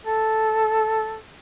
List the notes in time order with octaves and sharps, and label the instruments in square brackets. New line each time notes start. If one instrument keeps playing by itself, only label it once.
[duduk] A4